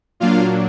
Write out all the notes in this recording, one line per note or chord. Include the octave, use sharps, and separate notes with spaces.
A#2 F#3 A#3 D4 F4 F5